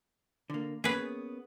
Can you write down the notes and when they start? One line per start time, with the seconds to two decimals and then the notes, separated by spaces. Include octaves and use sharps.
0.50 D3 A#3
0.84 A#3 B3 C#4 G#4 B4